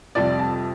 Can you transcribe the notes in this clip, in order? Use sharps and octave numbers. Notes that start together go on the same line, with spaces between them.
F2 C3 G3 D5
A5